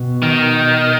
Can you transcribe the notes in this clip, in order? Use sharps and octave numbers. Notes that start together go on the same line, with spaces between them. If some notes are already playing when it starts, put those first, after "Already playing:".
Already playing: B2
D#3